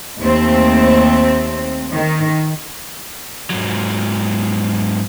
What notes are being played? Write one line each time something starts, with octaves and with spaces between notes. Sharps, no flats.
D#2 A3 C4
D#3
G#2 F#3